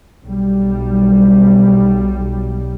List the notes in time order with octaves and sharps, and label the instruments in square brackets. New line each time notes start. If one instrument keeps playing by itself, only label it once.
[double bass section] B1 G3